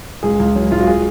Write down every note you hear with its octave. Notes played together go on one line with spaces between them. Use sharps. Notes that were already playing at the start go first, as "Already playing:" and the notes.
C#2 G#4
C#2
F#3
C#2 F4
F#4
G#4